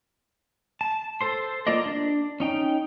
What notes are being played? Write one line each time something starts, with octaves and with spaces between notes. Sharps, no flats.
A5
A4 C5 C6
A#3 F4 A4 D5 D#5
D4
C#4 D#4 G5